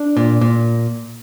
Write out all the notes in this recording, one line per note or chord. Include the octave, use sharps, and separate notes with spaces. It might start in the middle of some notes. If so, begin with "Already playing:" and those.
Already playing: D4
A#2
A#2